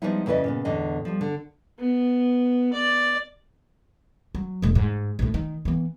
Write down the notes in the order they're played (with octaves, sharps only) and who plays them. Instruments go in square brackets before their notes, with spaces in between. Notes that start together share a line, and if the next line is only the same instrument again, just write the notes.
[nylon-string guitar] F3 G3 G#3 B3 D#4 E4
F2 C#3 E4 B4 D5 D#5
A#2 C#3 B3
E2 A2 D3 D#5
F3 G3
D3
[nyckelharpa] B3
D5
[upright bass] F#3
E1 A2
G#2
A#1 A2
D#3
E3 B3